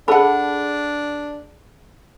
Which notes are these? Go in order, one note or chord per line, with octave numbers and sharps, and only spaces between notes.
D4 G#4 A4 F#5 A5 B5